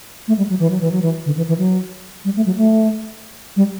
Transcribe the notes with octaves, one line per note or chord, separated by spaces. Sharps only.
A3
G3
F#3
E3
F#3
E3
F#3
E3
D3
E3
E3
F#3
G3
A3
F#3
A3
G3